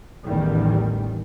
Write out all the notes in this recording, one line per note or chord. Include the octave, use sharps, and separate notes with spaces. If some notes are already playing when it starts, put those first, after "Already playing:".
A1 E2 D#3 G3